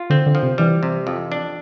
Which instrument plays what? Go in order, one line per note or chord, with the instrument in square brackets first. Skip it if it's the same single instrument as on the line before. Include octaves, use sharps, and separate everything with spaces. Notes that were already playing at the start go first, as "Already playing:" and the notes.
Already playing: [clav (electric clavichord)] F4
[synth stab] D3 [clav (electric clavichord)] C4
[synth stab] D3
[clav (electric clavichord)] F3
[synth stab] C3
[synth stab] E3 [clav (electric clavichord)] G3
[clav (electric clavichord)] C3
F2
D4